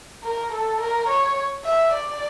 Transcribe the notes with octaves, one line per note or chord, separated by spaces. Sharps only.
A#4
A4
A#4
C#5
E5
D5